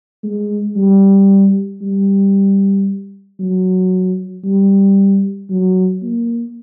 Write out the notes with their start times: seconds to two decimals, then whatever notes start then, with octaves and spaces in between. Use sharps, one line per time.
0.23 G#3
0.76 G3
1.81 G3
3.39 F#3
4.44 G3
5.50 F#3
6.02 A#3